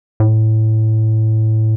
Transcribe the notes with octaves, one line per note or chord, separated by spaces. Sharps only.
A2